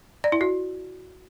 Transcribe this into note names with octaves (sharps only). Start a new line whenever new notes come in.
D5
E4
F#4